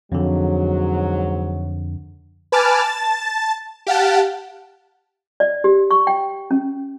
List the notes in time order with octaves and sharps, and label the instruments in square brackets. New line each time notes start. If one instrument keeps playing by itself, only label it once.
[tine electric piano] F2 D3 [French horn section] G#2 F#3
[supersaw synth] B4 G#5 A5 D6 F6 A6
A5 A6
G4 F5 F#5 A5
[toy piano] D5
G4
C#6
G5
C#4